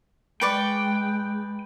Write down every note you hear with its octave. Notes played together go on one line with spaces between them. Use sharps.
G#3 B4 D5 G5 C#6